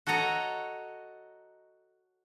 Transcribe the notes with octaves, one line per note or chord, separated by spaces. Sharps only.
F#4 A4 C#5 D#5 A#5